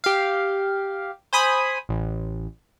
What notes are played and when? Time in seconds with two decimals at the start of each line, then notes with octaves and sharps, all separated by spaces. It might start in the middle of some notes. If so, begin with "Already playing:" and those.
0.04 G4 F5
1.33 C5 G#5 B5 D#6
1.89 A1